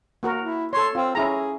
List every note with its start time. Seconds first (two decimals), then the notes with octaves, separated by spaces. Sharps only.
0.23 A#3 F#4 A#4
0.40 E4
0.73 A4 C#5 C6
0.95 C4 F4
1.15 C#4 E4 G#4 A#5